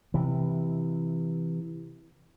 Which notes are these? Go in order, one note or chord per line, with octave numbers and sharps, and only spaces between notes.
C3 E3